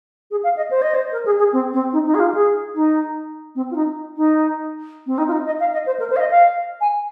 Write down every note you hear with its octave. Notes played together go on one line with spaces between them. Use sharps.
G#4
F5
D#5
C5
D#5
C5
A#4
G#4
G#4
C4
C4
D#4
D#4
G#4
F4
G#4
D#4
C4
F4
D#4
D#4
C4
D#4
F4
D#4
D#5
F5
D#5
C5
A#4
C5
F5
D#5
F5
G#5